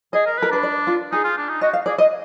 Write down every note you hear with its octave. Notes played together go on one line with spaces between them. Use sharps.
G#4 D#5
A#4
B4
A#4
D4 B4
D5
F4
D#4 G#4
F4
D4
D#4
F#4 D#5
F5
G#4 D5
D#5